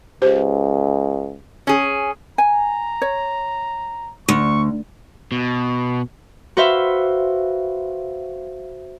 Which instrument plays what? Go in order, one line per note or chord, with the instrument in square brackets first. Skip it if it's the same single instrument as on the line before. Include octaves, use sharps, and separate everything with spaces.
[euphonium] C#2 [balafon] G4 C5
[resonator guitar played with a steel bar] C#4 G#4
[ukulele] G#5 [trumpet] A#5
[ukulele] C#5
[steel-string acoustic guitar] D2 [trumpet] C#6
[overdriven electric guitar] B2
[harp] F#4 B4 C5 E5 F5